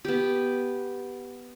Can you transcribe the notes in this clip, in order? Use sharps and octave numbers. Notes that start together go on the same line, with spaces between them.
B3 G4